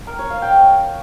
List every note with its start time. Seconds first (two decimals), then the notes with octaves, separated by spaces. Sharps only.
0.07 A#4
0.19 C#5
0.30 F5
0.42 G5